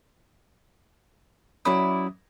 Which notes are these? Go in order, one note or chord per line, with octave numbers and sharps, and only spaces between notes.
F#3 C#4 E4 D5 D#6